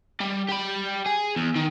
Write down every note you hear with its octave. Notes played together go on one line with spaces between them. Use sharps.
G3
G4 B5
G#4
E2
D#3